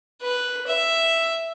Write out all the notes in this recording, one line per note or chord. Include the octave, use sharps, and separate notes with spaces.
B4
E5